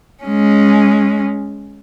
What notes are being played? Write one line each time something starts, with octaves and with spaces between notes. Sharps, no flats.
G#3 C#4